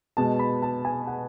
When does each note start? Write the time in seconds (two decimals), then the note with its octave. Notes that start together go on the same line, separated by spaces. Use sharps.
0.17 B2 G#3 A5
0.39 B5
0.63 A5
0.85 G#5
1.07 F#5